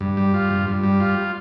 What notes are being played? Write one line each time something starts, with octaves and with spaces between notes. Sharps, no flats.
G2
G3
F4
G2
G2
G3
F4